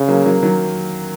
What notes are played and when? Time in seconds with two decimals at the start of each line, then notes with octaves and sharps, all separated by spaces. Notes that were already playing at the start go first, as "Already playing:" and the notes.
Already playing: C#3
0.08 F#3 A#3
0.26 F#3 A#3
0.43 D#3 F#3